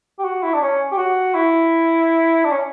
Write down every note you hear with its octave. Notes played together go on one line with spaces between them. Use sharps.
G4
F#4
E4
D4
C#4
G4
F#4
E4
D4
C#4